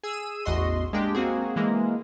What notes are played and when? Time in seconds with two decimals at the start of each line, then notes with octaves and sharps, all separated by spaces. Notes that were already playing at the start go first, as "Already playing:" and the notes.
0.03 G#4 E6 D#7
0.45 A1 E2 F#4 D#5 C6
0.93 G#3 A#3 D4 G4
1.15 A#3 C4 F#4 G#4
1.56 E3 G#3 A#3